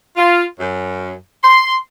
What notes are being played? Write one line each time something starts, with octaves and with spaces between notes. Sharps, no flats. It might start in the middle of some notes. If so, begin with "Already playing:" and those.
F4
F#2
C6